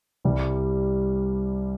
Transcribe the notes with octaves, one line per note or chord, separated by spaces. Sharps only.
C2 C3 G3